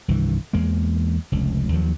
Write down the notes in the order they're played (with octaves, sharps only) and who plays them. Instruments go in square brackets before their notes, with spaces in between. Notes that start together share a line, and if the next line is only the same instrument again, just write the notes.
[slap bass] C2 G2 D#3 E3
E2 G#3 A#3
F1 C#2
D#2 F3 F#3